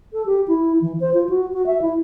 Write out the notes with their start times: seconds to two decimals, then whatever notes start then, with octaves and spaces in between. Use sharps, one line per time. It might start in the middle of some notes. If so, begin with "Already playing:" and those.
0.13 A4
0.26 G4
0.48 E4
0.82 E3
1.00 C5
1.14 F4
1.29 F#4
1.53 F#4
1.66 E5
1.82 E4